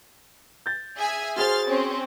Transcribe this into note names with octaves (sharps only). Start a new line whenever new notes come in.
G6 A6
G#4 E5 G#5
F#4 G#4 C5 C6 F6 A6
C4 C#4